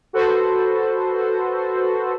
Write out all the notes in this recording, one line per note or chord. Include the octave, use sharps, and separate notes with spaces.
F#4 A4 B4 C5